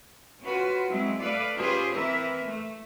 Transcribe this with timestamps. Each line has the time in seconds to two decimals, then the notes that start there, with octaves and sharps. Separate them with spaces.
0.43 C#4 F4 F#4 B4
0.89 F#3 G#3 C4 E4
1.20 A3 A4 B4 D5 F5
1.55 C#4 F4 G4 G#4 B4 C5
1.93 E3 C4 E4 A#4 B4 E5
2.46 A3